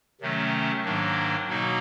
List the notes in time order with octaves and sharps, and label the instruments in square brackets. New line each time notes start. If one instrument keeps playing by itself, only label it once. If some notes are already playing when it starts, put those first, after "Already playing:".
[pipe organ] C3 D#3 F#3 A3 C#4
G#2 D#3 F#3 A#3 D4
B2 F#3 A#3 D#4 F#4